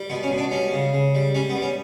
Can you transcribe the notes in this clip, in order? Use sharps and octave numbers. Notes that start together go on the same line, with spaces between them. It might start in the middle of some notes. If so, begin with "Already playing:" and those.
Already playing: G3
B2 B3
C#4
B2
D4
G3 C#4
C#3
C#3
G3
G3 C#4
B3
G3
C#4